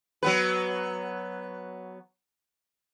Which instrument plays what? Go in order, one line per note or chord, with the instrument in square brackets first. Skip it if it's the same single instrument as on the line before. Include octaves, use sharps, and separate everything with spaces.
[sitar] F#3 B3 B4